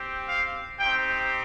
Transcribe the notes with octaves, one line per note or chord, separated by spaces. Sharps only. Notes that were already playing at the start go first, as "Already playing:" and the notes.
Already playing: C4 G4
F5
C4 D#4 G4 G5